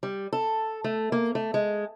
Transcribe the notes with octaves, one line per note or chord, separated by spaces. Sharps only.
G3
A4
A3
A#3
A3
G#3